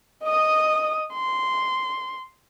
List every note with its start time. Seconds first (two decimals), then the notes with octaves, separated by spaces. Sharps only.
0.23 D#5 D#6
1.13 C6